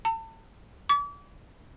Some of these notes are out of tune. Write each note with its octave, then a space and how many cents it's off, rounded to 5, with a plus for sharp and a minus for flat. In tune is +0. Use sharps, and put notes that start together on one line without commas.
A5 +40
D6 -40